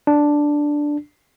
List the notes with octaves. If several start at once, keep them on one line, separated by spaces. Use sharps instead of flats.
D4